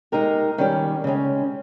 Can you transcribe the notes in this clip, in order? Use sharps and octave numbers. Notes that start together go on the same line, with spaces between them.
G#3 D#4 G4 A#4
D#3 G3 C#4 G4
C#3 G#3 C#4